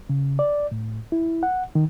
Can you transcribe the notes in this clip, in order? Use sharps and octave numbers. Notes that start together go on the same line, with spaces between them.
C#3
D5
A2
E4
F#5
D#3